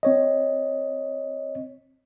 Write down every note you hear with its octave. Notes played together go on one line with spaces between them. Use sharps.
C4 C#5 D#5